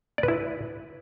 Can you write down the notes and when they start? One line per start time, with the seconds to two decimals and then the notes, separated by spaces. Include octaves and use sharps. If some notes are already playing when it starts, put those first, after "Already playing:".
0.18 D5
0.23 B4
0.28 E4